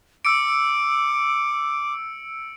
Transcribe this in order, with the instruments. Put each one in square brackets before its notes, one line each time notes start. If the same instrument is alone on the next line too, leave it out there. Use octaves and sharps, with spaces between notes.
[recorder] D6 [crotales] E6 C#7 D7